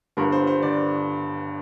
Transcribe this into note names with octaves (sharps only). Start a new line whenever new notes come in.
G1 G2 D3 A#4
C5
C5
D3 D5